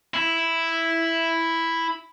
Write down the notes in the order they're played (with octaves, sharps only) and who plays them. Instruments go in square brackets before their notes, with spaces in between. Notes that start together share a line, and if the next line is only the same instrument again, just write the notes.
[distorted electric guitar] E4